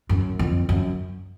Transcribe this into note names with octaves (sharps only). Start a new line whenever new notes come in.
F#2
F2
F#2